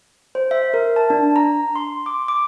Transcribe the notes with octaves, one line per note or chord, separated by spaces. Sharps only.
C5
E5
A#4
A5
D4
A#5
C6
D6
D6